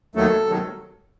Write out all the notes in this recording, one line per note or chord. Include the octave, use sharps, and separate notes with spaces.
D#2 D#3 F#3 A3 A4
C3 D#3 F#3